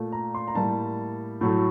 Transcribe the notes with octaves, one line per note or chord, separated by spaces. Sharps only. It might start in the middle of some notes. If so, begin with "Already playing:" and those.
Already playing: A#2 A3
A#5
C6
A#5
A2 G3 A#3 A5
A2 F#3 A3